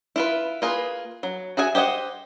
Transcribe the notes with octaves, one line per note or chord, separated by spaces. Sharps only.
E4 F4 B4
A#3 F4 G#4 B4
F#3
F#4 G#4 E5 G#5
G4 C5 D#5 F#5